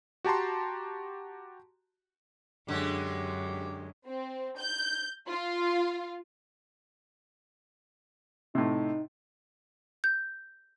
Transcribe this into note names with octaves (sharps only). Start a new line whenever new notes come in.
F#4 G4 A5 A#5 C6
F#2 D3 G#3 G4
C4
G6
F4
A2 C3 D#4
G6